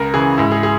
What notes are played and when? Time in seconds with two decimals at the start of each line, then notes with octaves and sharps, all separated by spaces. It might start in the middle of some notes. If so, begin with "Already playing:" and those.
Already playing: C#2 A#4
0.14 C#3 E3 G#4
0.38 G#2 E4
0.52 G#4
0.63 G#4